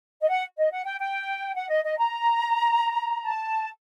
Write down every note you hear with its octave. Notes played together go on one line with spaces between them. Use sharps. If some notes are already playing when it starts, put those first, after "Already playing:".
D#5
F#5
D#5
F#5
G5
G5
F#5
D#5
D#5
A#5
A5